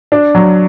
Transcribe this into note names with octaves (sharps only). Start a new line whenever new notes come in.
D4
F#3